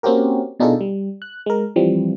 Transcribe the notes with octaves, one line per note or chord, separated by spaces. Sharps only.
A#3 C4 C#4 F#4 G4 A#4
B2 D4 D#4 F4 G#4 A4
G3
F#6
G#3 A#4
E3 F3 G3 C4